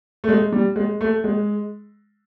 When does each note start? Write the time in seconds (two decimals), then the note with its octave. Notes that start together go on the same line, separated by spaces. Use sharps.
0.24 A3
0.29 G#3
0.52 G3
0.76 G#3
1.01 A3
1.24 G#3